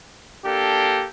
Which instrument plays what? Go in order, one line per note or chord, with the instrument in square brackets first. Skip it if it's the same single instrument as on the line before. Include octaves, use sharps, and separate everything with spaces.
[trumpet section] A#3 D4 G4 A4